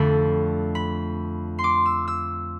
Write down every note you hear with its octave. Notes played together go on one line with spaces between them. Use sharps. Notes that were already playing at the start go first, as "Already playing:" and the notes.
Already playing: F2 D3 A3 D4 B5
B5
C6
D6
E6
E6